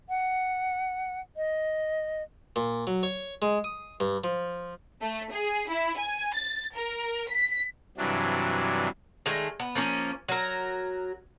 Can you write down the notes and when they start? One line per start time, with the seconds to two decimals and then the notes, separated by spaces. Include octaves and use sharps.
0.09 F#5
1.37 D#5
2.56 A#2
2.87 F#3
3.03 C#5
3.42 G#3
3.64 D#6
4.00 G2
4.24 F3
5.01 A3
5.32 G#4
5.69 E4
5.98 G#5
6.34 A6
6.75 A#4
7.29 B6
7.97 G2 C3 E3 F#3 D4
9.26 D#3 G#3 A3
9.60 B3
9.75 F3 A#3 C#4
10.29 F#3 A#4